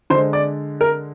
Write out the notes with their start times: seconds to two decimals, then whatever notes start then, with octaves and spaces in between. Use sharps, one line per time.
0.10 D3 C5
0.15 G#3
0.33 D5
0.81 A#4